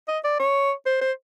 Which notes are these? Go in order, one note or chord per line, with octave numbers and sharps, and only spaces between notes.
D#5
D5
C#5
C5
C5